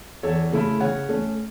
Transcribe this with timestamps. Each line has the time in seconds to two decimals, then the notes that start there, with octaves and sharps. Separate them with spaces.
0.23 E2 A4 C#5
0.52 C#3 A3 E4
0.80 C#3 C#5 F#5
1.09 A3 C#4